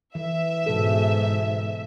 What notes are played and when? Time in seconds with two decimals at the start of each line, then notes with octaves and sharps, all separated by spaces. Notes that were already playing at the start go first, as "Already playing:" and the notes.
0.15 E3 E5
0.66 G#2 B2 G#3 A4